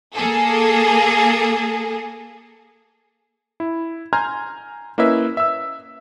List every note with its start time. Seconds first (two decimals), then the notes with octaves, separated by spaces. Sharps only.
0.14 A#3 G#4 A4
3.60 E4
4.13 G#5 A#5 C6 F6 G6 G#6
4.98 A#3 C#4 E4 B4 D#5 E5
5.37 E5 E6